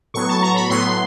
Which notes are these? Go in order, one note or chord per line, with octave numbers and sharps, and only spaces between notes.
A2 F#3 B3 C#6
A5
A#5
B5
A2 F#3 B3 C6